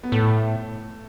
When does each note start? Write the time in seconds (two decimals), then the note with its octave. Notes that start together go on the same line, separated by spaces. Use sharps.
0.03 B3
0.12 A2 A3